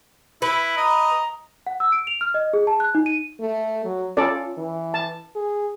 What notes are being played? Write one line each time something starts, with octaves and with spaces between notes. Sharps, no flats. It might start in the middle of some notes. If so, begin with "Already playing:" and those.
E4 B4
D#5 A#5
F#5
E6
D7
F7
F6
D#5
G#4
A5
F#6
D#4
D#7
A3
F#3
C#4 F4 A4 D5
E3
A5
G#4